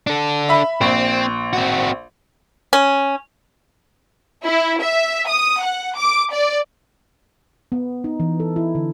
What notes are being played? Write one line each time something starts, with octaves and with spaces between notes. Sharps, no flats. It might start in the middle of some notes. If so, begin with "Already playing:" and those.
D4 A4
E5 B5
A#1 C4
C4 F#4
C#4
E4
E5
D#6
F#5
D6
D5
B3
D#4
E3
A4
E4
D3